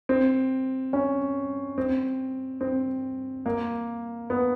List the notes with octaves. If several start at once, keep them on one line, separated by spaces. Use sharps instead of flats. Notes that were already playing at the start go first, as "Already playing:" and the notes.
C4
C#4
C4
C4
A#3
B3